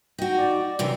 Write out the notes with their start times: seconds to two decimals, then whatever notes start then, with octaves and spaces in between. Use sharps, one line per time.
0.18 D#4 F#4 G5
0.38 D5
0.79 F#2 C3 E3